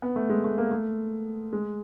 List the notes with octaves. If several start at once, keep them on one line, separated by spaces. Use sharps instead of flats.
B3
A3
G#3
A3
A#3
A3
G#3